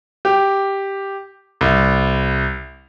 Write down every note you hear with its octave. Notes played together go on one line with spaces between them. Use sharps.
G4
C2